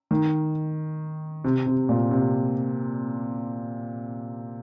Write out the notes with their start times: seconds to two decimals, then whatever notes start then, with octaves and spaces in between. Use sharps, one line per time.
0.11 D#3
1.44 C3
1.66 C3
1.89 A#2
2.11 C3